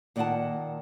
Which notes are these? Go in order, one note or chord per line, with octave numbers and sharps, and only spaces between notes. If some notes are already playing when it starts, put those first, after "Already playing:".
A#2 D#3 F#4 G#4 F#5 A5